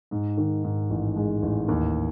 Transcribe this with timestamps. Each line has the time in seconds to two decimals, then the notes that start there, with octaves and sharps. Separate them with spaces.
0.11 G#2
0.37 D#3
0.64 G#2
0.90 A1
1.16 G#3
1.42 A1
1.68 D#2